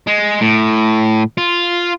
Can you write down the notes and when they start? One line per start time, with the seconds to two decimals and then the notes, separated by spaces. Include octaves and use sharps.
0.07 G#3
0.41 A2
1.37 F4